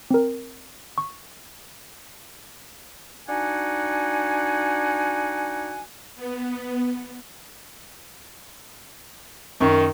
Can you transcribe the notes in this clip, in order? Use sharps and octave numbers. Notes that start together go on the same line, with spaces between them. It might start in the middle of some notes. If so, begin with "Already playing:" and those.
C4 A#4
C#6
D4 D#4 F#4 F#5 G#5
B3
F#2 D#3 C#6